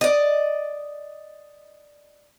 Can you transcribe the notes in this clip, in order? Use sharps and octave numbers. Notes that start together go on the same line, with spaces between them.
D5 D#5